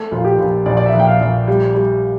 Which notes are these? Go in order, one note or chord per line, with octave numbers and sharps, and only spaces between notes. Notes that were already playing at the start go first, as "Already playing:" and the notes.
Already playing: A3
A#1 F4
G4
A#1
A#1 D5
D5
E5
A#1
G5
F5
A#1
G3
G3